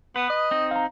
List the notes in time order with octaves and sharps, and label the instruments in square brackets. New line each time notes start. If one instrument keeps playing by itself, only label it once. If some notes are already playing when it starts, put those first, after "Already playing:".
[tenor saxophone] B3 [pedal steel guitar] B4
[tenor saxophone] D#5
[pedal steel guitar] C4 D#4
[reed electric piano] F5 A#5